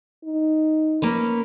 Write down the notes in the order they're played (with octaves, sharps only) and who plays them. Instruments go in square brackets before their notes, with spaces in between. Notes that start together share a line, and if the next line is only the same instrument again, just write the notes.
[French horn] D#4
[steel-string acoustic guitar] A#3 C#4 B4